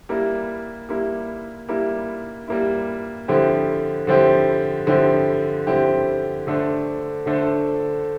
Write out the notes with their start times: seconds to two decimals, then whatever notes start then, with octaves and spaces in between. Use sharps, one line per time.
0.09 G3 A#3 E4
0.89 G3 A#3 E4
1.68 G3 A#3 E4
2.48 G3 A#3 E4
3.28 D3 F3 C4 E4 G4
4.07 D3 F3 C4 E4 G4
4.87 D3 F3 C4 E4 G4
5.67 D3 F3 C4 E4 G4
6.47 D3 A3 D4 A4 C5
7.26 D3 A3 D4 A4 C5